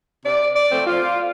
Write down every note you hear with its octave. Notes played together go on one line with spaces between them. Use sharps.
C3 D5
D5
F3 A3 C4
F4